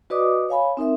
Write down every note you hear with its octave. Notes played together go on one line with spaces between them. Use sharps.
F#4 B4 D5 D#5 D6 D#6
C#5 F5 G#5 B5
C4 D#4 A#4 E5